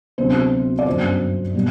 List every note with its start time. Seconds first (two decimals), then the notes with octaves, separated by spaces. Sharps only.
0.18 D2 C3 F#3 B3 D4 C5
0.79 D5
0.86 G1 F#2 F#3 A3 D4 C5
1.55 B2 G3